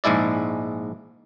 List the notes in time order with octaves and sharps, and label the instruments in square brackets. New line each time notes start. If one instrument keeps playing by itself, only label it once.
[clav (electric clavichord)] A#1 G#2 G#3 E4 D5